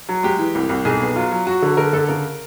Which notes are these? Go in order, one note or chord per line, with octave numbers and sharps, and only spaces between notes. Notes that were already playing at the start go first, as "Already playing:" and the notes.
F#3
G#3 G4
E3
C2
C2
B1 G#4
B3
F#3 F4
F#3
F#3 F#4
D3
D3 A#4
D3 A4
C#3 A#4